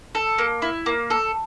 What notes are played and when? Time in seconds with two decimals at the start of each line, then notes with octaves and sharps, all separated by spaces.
0.15 A4
0.38 A#3
0.62 E4
0.86 A#3
1.10 A4